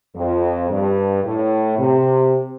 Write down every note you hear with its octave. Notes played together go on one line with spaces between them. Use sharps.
F2
G2
A2
C3